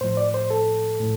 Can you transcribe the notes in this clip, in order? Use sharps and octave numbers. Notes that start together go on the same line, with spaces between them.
A2 F3 C5
D5
C5
A4
A2